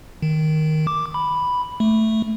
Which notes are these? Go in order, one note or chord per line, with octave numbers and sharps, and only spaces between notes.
D#3
D6
B5
A3